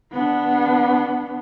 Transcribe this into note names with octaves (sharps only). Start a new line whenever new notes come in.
B3 D4